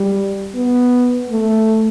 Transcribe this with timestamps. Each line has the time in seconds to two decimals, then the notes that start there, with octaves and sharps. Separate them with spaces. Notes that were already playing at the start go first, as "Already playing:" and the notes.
Already playing: G3
0.55 B3
1.30 A3